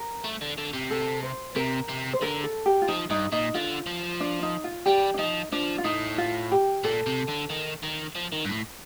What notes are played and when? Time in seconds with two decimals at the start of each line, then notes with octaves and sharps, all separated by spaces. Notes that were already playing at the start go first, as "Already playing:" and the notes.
Already playing: A#4
0.24 A3
0.41 D3
0.58 D3
0.73 C3
0.91 A4
1.23 C5
1.56 C3 A#4
1.89 C3
2.13 C5
2.22 D3 A#4
2.44 A4
2.66 G4
2.82 F4
2.88 F3 D#4
3.10 G2 D#4
3.32 A#2 D#4
3.54 D3 F4
3.87 F3
4.20 D4
4.43 D#4
4.64 F4
4.86 G3 G4
5.14 D4
5.18 F3 D#4
5.52 F3 D4
5.78 F4
5.84 A2 D#4
6.18 F4
6.52 G4
6.84 A#2 A4
7.06 C3
7.28 D3
7.50 D#3
7.83 D#3
8.15 F3
8.32 D#3
8.45 G2
8.49 A2